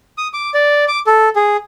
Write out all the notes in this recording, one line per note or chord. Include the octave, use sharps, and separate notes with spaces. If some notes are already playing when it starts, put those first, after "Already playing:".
D#6
D6
D5
D6
A4
G#4